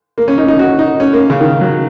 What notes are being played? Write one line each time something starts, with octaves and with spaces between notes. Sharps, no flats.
A#3
C#4
D#4
D#4
F#4
D#4
C#4
A#3
C#3
D#3
F#3